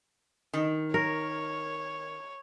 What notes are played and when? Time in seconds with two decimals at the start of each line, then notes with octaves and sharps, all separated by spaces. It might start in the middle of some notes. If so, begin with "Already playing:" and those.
0.53 D#3
0.94 A#4 C#5